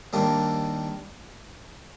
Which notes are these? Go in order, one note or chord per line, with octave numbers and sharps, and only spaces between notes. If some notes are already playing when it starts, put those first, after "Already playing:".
D#2 D#3 G3 A#3 D4